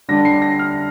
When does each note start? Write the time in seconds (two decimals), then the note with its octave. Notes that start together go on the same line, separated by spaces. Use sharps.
0.08 D3 G3 D4 A#6
0.25 C7
0.42 A#6
0.59 F6